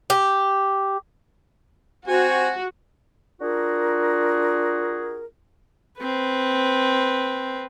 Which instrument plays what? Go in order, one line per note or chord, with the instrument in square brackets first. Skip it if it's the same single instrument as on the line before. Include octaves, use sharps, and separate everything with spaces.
[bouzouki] G4
[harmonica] C4 G#5 [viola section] F#4
[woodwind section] D4 F4 F#4 G#4 A#4
[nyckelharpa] C4 B4